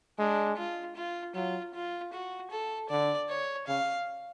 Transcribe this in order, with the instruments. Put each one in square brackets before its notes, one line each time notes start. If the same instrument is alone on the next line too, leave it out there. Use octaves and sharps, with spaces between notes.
[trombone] G#3 [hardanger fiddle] D4
[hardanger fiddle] F4
F4
[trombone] F#3 [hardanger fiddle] F4
[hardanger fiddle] F4
F#4
A4
[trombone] D3 [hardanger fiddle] D5
[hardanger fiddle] C#5
[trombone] C#3 [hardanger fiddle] F5